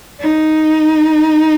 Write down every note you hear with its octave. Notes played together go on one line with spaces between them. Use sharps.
D#4